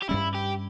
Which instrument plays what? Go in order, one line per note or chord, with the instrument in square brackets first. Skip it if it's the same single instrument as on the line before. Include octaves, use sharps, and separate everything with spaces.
[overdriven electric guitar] G4
[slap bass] G2 G3 C#4 [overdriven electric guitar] E4
[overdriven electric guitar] G4